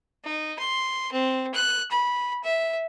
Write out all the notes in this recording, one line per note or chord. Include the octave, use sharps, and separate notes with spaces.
D#4
C6
C4
F#6
B5
E5